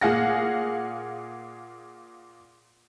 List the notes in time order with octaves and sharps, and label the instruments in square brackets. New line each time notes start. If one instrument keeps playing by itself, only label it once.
[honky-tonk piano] A#2 G#4 F5 F#5 A#6